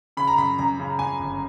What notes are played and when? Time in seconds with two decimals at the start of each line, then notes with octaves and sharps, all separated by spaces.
0.17 C#3 B5
0.27 A#5
0.38 F#2 B5
0.58 F#2 A#5
0.79 C#3
0.99 F#2 G#5
1.19 G1